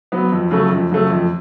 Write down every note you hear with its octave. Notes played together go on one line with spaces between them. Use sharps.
F#3 B3
F2
C#3 F#3 A3
F2
C#3 F#3 A3
F2